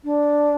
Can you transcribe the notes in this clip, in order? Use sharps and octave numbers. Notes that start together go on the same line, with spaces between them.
D4